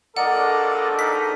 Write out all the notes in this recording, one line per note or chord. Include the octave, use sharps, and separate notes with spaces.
A#1 D4 A4 A#4 D5 D#5 F#5
D#4 A#4 D#5 B6